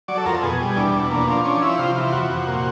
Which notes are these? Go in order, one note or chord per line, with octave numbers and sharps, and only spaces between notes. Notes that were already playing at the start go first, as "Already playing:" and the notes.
F#3 D5
A4
F2 A#4
A4
B2 G#4
G3
E2 D4
B2
A#3 D4
F3 D4
C#4 D4
F3 E4
C3 F4
E3 F4
F2 F#4
C3
A#2